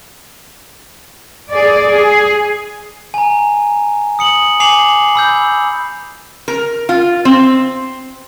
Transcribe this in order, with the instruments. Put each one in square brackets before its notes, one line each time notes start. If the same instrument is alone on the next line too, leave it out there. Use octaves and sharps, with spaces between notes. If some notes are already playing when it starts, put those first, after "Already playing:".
[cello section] G#4 D5
G#4
[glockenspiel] G#5 A#5
D#6 C#7 F#7
G#5 D6 C7 F7 F#7
B5 E6 G6
[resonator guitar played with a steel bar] A#4
F4
C4